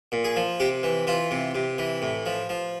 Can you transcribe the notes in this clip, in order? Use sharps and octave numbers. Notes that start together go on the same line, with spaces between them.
A#2
G#4
F3
C3 G4
E3
E3 F4
C3
C3
E3
A2
F3
F3